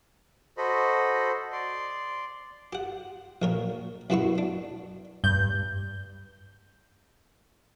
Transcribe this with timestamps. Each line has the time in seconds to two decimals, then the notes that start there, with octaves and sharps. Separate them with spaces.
0.57 F#4 A4 C5 D#5 B5
1.52 D5 C6
2.73 G4 F#5
3.42 A#1 A#4 C#5
4.10 F#2 B2 E4 F#4 C6 C#6
4.38 D4
5.24 G2 G6